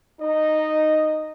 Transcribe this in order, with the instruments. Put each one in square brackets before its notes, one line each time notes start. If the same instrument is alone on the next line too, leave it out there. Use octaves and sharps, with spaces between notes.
[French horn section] D#4 [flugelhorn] D#5